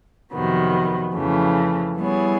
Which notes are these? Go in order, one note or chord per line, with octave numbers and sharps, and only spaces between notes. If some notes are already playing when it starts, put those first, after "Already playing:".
F2 C3 D#3 F#3 B3
F2 C#3 E3 A3
G3 B3 E4 G#4 C#5